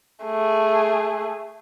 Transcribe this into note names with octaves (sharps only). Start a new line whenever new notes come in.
A3 G#4